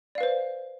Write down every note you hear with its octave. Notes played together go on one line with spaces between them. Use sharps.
B4 C5 D5 F5